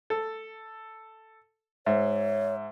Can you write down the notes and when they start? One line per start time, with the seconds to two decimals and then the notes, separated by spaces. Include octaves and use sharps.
0.10 A4
1.86 G#2 C#5 E5